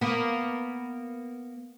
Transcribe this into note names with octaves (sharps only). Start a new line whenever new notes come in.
A#3 B3